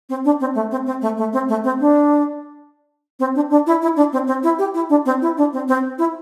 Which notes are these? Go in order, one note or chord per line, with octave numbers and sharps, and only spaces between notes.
C4
D4
C4
A3
C4
C4
A3
A3
C4
A3
C4
D4
C4
D4
D4
E4
E4
D4
C4
C4
E4
G4
E4
D4
C4
E4
D4
C4
C4
E4